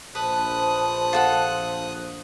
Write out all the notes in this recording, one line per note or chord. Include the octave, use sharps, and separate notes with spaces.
A#1 B4 C5 A5 D#6 F#6
F4 A4 F#5